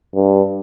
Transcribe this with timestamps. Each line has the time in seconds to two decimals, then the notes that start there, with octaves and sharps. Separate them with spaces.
0.15 G2